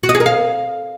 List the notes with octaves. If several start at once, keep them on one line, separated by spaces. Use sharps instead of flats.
F#4
D#5
G#4
A#4
F5